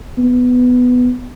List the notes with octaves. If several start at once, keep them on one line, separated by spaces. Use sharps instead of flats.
B3